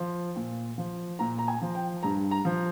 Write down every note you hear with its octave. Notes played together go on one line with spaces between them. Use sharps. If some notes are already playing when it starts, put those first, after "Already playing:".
Already playing: F3
A#2
F3
A#2 A#5
A#5
G#5
F3
G5
G2 A#5
A#5
F3